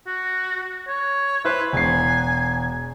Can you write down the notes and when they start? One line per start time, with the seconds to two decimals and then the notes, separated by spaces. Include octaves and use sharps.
0.06 F#4
0.88 C#5
1.45 E4 B4 C5
1.73 E1 G#5 C7